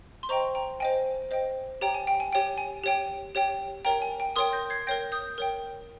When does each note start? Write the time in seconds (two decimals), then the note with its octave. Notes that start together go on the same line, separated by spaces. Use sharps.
0.23 C6
0.29 C5 D#5 G5 A#5 C#6
0.55 G5 A#5
0.80 C5 D#5 G5 G#5
1.31 C5 D#5 G5
1.81 G4 C#5 G5 A#5
1.94 G#5
2.07 G5
2.20 G#5
2.33 G4 C#5 G5
2.58 G#5
2.84 G4 C#5 G5
3.35 G4 C#5 G5
3.85 A#4 C#5 G5 A#5
4.02 G#5
4.20 G5
4.36 A#4 C#5 G5 C6 D#6
4.53 G6 A#6
4.70 G#6 C7
4.87 A#4 C#5 G5 G6 A#6
5.12 D#6 G6
5.38 A#4 C#5 G5